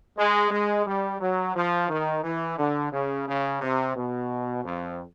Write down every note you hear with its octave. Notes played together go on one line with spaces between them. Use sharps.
G#3
G#3
G3
F#3
F3
D#3
E3
D3
C#3
C#3
C3
B2
F2